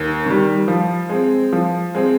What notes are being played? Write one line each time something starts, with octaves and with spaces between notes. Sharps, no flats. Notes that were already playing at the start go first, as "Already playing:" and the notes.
Already playing: D#2
D#3 G3
F3
G#3 C4
F3
G#3 C4